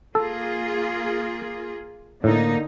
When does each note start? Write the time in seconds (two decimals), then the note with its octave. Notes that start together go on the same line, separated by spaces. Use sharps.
0.15 A#3 F4 G#4 A4
2.24 A2 D3 A#3 D#4